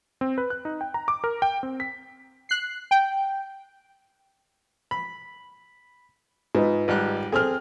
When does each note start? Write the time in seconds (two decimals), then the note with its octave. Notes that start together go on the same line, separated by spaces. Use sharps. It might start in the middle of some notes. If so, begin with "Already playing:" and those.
0.21 C4
0.38 B4
0.50 F#6
0.65 D#4
0.81 G5
0.94 A#5
1.08 D6
1.24 A#4
1.42 G5
1.63 C4
1.80 B6
2.49 F#6 C7
2.91 G5
4.91 B5
6.55 G#2 F4 B4 D#5
6.88 G#1 G3 F#6
7.32 C4 G#4 A4 F6